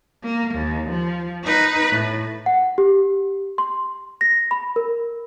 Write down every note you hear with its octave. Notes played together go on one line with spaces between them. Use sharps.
A#3
D#2
F3
D#4 B4
A2
F#5
G4
C6
A#6
B5
A#4